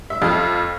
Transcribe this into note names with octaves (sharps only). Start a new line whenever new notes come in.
E5
F2 F5